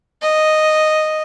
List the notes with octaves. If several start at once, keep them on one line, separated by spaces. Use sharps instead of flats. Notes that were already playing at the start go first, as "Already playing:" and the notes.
D#5